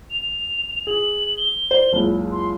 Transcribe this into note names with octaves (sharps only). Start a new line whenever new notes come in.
F7
G#4 F#7
G7
C5 D5
F#1 C#2
C6